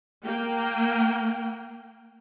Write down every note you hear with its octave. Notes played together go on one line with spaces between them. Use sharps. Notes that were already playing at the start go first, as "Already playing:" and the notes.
A#3 G5